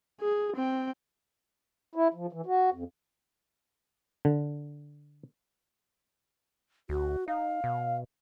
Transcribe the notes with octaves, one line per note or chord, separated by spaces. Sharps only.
G#4
C4 G5
E4
F3
E3
F#4
F2
D3
D2 F#4
D#4 F5
B2